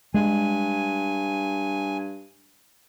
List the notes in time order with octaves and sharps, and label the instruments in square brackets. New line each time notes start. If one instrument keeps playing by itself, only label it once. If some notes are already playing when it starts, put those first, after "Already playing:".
[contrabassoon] G2 [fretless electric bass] G#3 [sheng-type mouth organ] G#5